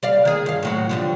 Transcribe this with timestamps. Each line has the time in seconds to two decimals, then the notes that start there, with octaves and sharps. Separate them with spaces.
0.03 G3 D5 F5
0.25 D#3 G#4
0.46 G2 F5
0.63 A2 F#3 F#4
0.89 D3 F3 G3